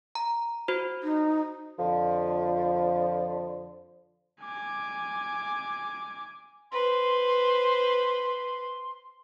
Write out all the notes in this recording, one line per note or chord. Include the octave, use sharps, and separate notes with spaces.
A#5
F#4 C5
D#4
F2 D3 F3
G#5 D6
B4 C5 C6